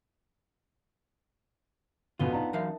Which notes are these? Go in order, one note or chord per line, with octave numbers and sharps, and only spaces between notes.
F1 A#1 B2 B3 F4 F#4 D#7 G7
D4 D#4 F5 A5 A#5
F#2 E3 A#4 E5 F5